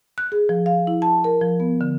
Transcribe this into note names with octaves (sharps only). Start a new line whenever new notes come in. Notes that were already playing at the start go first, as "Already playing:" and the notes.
F#6
G#4
F3
F5
E4
A5
A#4
F3
B3
D3